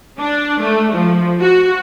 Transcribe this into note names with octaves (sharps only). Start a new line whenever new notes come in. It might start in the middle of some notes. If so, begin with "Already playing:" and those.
D4
A3
F3
F#4